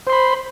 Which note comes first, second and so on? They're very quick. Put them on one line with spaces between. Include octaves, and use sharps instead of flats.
C5 C6 B5